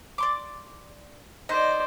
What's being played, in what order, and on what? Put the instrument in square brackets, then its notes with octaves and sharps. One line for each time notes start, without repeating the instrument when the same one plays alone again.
[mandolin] D5 C6 D6
[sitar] D#4 [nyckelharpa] C5 D5 [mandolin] D#5